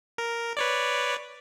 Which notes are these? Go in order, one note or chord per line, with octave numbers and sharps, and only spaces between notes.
A#4
B4 C#5 D5